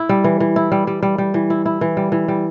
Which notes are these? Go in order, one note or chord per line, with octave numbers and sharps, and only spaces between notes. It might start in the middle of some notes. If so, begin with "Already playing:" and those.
Already playing: E4
G3
E3
E3
E4
G3
G3
G3
G3
E3
E4
E4
E3
G3
E3
G3